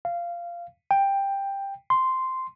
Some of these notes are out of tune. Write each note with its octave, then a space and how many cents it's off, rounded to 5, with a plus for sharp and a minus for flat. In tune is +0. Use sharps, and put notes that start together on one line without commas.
F5 -15
G5 +10
C6 -5